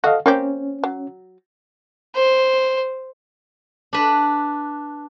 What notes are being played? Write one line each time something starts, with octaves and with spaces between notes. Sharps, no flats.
F#4 A4 D#5 F5
A#3 C4 C#4 G4
F#3
C5
D4 B4